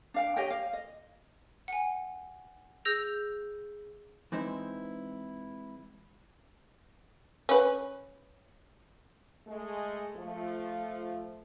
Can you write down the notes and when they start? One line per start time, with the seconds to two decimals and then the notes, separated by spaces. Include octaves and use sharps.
0.14 D4 F5 G5
0.36 G4 C#5 D#5 G5
0.50 F5
0.73 D#5
1.68 F#5 G#5
2.85 G#4 E6 G6 A#6 F7
4.32 E3 G#3 C4 D#4 E4 C5
7.49 C#4 B4
9.47 G#3 A3
10.16 F3 A3